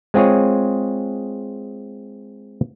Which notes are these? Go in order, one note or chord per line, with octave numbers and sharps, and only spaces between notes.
G#3 C4 F4 G#4 C#5